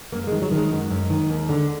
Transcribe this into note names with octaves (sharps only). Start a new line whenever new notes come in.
F#2 A#3
D#3 G#3
F#3
D#3 G#3
F#2
F#2
D#3
D#2
D3